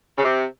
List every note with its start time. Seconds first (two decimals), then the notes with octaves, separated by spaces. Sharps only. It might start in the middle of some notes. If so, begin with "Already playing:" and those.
0.18 C#3
0.24 C3